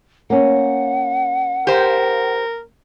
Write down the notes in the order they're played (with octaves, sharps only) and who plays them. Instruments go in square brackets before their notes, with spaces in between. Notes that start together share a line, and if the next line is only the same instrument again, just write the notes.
[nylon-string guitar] A#3 C#4 [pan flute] F#5
[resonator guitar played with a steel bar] G4 C5 [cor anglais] A#4